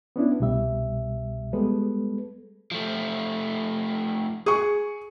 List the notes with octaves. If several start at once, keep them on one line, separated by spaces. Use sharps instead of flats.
B3 C#4 D4 E4
C2 B2 G3 E5
G3 G#3 B3 A4 B4
F3 A3
G#4 C#6